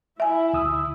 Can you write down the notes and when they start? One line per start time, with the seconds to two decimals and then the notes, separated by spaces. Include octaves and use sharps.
0.20 E4 E5 G#5
0.53 D2 D#6 E6